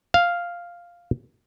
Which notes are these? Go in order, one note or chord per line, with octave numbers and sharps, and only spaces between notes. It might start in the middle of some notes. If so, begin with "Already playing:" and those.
F5